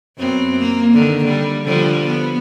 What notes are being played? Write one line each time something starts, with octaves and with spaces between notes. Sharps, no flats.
F#2 B3 C4
A#3
D3 D#3
D3 G3
D3 F3 G3
B3